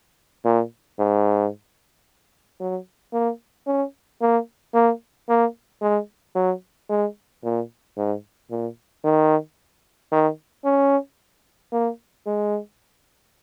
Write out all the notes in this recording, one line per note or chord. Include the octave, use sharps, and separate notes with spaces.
A#2
G#2
F#3
A#3
C#4
A#3
A#3
A#3
G#3
F#3
G#3
A#2
G#2
A#2
D#3
D#3
C#4
A#3
G#3